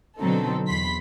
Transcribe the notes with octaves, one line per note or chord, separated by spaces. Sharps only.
B2 D3 F#3 C4 D#4 A4
E2 B5 C6 B6